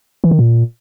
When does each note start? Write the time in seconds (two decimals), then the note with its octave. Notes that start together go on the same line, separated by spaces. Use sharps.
0.24 E3
0.31 D#3
0.39 A#2